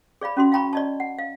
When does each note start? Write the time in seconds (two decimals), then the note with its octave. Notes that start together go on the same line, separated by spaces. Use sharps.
0.21 G#4 D5 F5 B5
0.37 C#4 F#4 C6
0.52 F5 G5 A#5 B5 C#6
0.73 D5 D#5 A5
1.00 F#5
1.19 F5